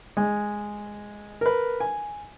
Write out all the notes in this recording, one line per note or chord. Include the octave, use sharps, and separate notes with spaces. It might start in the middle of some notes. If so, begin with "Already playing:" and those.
G#3
A#4 B4
G#5